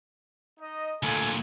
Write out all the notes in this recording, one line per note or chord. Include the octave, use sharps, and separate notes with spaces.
D#4 D#5
D2 A#2 A4 F5 G#5